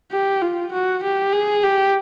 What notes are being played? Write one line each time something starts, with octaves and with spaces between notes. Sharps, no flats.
G4
F4
F#4
G4
G#4
G4